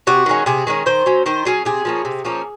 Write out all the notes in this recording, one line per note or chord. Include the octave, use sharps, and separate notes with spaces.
C3 F#4
D#3 G#3 C#4
C3 G#4
D#3 G#3 C#4
D#3 C5
F#3 C#4
D#3 C5
F#3 C#4 G#4
C3 G#4
F3 A#3 C#4
C3
F3 A#3 C#4